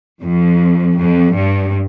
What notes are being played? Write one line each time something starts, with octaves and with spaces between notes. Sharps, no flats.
F2
F2
G2